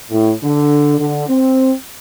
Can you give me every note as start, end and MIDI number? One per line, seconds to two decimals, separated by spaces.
0.11 0.31 45
0.43 0.97 50
0.98 1.24 50
1.29 1.72 60